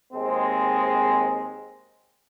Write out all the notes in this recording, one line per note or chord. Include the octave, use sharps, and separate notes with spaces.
D#2 G#3 C4